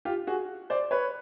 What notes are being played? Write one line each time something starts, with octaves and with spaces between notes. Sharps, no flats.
F4 G4
F#4 G#4
C5 D5
B4 C#5